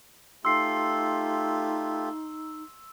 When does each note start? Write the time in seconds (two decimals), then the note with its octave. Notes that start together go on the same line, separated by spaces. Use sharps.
0.45 A3 D#4 F4 G4 C6 E6 C7